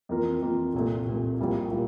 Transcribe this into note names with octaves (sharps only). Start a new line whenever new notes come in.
F2 E3 A#3 F4 A#4
F2 E3 A#3 F4 A#4
C2 A#2 A3
C2 A#2 A3
A#1 A#2 G3 A#3 E4
A#2 G3 A#3 E4